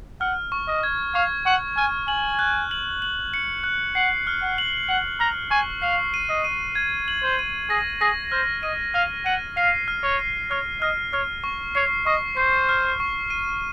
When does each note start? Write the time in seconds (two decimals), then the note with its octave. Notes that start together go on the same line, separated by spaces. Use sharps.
0.21 F#5 F6
0.52 C#6
0.68 D#5
0.83 G#6
1.15 F5 C#6
1.46 F#5 C#6
1.77 G#5 F6
2.08 G#5 F#7
2.39 F#6
2.71 F#7
3.02 F#7
3.34 C#7
3.64 F#6
3.95 F#5 C7
4.27 F6
4.42 F#5
4.58 F#7
4.89 F#5 F#7
5.20 A#5 F6
5.51 G#5 C#6
5.82 F5 C7
6.14 D#7
6.29 D#5
6.44 D#7
6.75 G#6
7.08 F#7
7.23 C5
7.39 D#7
7.70 G#4 A#6
8.01 G#4 A#6
8.32 C5 F6
8.63 D#5 D#7
8.94 F5 F6
9.26 F#5 D#7
9.57 F5 C7
9.88 F6
10.03 C#5
10.20 C7
10.51 C#5 F6
10.82 D#5 F6
11.13 C#5 F6
11.44 C#6
11.75 C#5 C7
12.06 D#5 C#6
12.37 C5 C7
12.69 F6
13.00 C#6
13.30 D#7